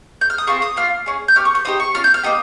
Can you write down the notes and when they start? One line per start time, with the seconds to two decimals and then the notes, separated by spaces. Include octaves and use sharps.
0.21 G6
0.30 F6
0.38 D#6
0.47 C4 F4 G#4 C#6
0.62 D#6
0.76 A#3 F4 F6
1.06 C#4 G#4
1.28 G6
1.35 C#4 G4 F6
1.45 C#6
1.55 G6
1.65 C4 D#4 G4 D#6
1.80 C#6
1.94 C#4 F4 F6
2.04 G6
2.14 F6
2.23 A#3 D#4 G4 D#6